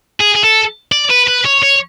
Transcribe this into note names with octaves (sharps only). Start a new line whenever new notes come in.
G#4
G#4
A4
D5
B4
B4
C#5
C#5